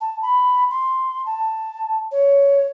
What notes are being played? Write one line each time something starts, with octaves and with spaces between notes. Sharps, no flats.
A5
B5
C6
A5
C#5